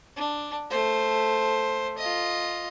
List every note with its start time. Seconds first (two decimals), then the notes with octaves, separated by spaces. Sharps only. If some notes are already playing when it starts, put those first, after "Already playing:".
0.16 D4
0.70 A3 C5
1.98 F4 D#5